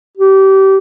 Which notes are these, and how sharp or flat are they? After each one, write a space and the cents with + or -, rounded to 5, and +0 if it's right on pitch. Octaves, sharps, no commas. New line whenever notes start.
G4 -25